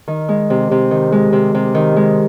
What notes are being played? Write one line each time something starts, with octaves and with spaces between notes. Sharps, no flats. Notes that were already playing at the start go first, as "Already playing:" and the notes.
D#3
G#3
C3
C3
D#3
G#3
C3
C3
D#3
G#3